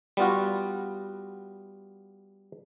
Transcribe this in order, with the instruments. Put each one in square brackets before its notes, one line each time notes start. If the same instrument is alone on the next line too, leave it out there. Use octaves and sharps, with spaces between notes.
[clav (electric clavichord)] G3 B3 F4 F#4